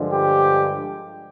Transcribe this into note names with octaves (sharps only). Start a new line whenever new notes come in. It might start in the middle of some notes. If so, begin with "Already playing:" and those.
Already playing: G2 D3 F3 G#3
G4